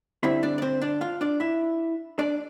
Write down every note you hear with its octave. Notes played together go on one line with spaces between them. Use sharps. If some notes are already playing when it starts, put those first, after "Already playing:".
G2 D3 G3 C4 E4 E5
D4 D5
D5
C4 C5
D4 D5
F4 F5
D4 D5
E4 E5
D4 D5